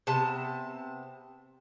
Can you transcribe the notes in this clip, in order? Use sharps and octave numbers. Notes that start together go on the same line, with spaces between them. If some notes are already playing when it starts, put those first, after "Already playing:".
C3 B3 A5